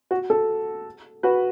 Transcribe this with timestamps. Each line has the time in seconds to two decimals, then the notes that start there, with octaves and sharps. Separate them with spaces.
0.11 F#4
0.30 A4
1.23 F#4 B4